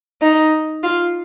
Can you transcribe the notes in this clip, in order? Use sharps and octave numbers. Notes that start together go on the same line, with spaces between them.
D#4
F4